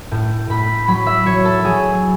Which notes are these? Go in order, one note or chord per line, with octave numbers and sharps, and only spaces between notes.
A2
A2 B5
F#3 B5
E5
F#3 C#5
A4
F#3 G#4